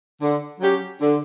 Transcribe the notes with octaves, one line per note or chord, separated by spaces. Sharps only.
D3
F#3 C#4 G4
D3